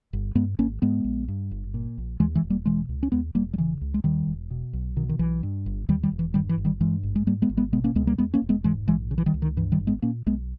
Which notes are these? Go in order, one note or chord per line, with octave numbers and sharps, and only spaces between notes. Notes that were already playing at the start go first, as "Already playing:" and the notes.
G1
G2 G#3 B3
G#1 A#3 C#4
G#2 G#3 B3
A#1
G2
G1
A#2
A#1
D#2 E3 G#3
E3 G#3
E1
G3 A#3
B2 E3 G#3
C#2
C#4
D#2 G#3 B3
E1 G3 A#3
G3
C#3 E3
C#2
G#3
D#2 D#3 G3
E1
B2
B1
B2 D#3
D#3
B1 E3
G2
G1
D#2 D#3 G3
D#3 G3
E1
E3
G2 D#3 G3
E3
G1
D#3 G3
G2 E3 G#3
G#1
G#3
G#2 G3 A#3
G#3 B3
G#1
G#3 B3
B2 G#3 B3
A#3 C#4
C#2 G#3 B3
G3 A#3
E2 G#3 B3
A#3 C#4
E1
G#3 B3
G#2 E3 G#3
A#1 E3 G#3
C#3
E3
D#3 G3
C#2
D#3
G2 E3
D#3 G3
G#1
G#3 B3
A#2 A#3 C#4
B1 G#3 B3